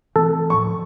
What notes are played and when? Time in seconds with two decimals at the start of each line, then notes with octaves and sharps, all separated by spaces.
0.16 E3 A3 C4 A4
0.50 A2 F3 C#6